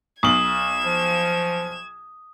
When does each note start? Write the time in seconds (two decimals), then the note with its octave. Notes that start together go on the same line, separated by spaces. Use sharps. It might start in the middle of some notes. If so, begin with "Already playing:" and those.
0.23 B1 D#6 G#6 E7 F#7
0.85 F3